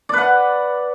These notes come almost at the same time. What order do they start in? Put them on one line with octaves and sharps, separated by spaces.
D5 B4 F#5